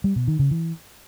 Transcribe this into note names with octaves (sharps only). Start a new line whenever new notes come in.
G3
B2
D#3
C#3
E3